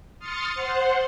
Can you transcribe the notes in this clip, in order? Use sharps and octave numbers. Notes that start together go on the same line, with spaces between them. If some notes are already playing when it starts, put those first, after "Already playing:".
C6 D#6 F6 A6 C#7
C5 F#5 C6